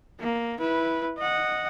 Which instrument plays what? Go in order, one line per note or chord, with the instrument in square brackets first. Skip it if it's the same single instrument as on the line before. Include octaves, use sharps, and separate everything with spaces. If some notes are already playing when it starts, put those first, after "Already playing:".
[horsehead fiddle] A#3
E4 B4
D#5 F#5